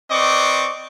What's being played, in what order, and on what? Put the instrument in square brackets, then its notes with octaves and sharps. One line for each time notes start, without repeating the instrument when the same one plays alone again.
[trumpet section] C4 B4 D5 D#5 C#6 D6